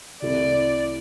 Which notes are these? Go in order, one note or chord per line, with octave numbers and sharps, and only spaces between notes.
C2 C3 A3 E4 A4 D5